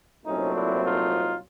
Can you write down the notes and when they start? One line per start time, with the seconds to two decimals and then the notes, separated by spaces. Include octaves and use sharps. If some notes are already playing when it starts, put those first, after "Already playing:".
0.25 C2 A#2 F#3 A3 C4 C#4 D#4
0.54 D4 E4
0.82 D#4 F4